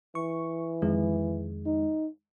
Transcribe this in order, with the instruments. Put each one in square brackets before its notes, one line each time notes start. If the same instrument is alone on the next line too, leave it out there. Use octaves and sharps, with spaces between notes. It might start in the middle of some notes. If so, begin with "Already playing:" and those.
[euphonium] E3 [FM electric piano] C#6
[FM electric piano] F2 D#3 G#3
[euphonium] D#4